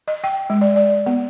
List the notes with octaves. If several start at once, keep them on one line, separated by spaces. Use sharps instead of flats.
D#5
G5
G#3
D5
D5
B3